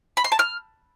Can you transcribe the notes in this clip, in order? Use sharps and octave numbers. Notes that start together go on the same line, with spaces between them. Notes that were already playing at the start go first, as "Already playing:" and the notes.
B5
C6
A5
F6